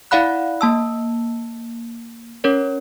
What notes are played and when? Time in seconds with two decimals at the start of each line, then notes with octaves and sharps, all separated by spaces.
0.11 E4 D5 F5 F#5 B5 F#6
0.61 A#3 A5 E6
2.44 C#4 A#4 C#5